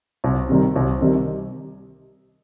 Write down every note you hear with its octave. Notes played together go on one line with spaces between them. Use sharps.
C2
C3 D#3 G3
C2
C3 D#3 G3